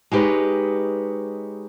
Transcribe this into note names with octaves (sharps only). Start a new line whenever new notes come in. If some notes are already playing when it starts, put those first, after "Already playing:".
G#3 D#4 G4 B4 C#5